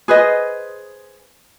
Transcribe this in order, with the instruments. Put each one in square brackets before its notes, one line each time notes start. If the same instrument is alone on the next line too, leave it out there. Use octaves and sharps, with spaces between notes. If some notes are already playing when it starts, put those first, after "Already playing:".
[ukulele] G#4 B4 C5 D#5